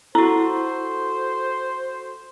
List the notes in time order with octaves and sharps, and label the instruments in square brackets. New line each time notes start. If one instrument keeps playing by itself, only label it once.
[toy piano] E4 [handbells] F#4 A4 [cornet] C5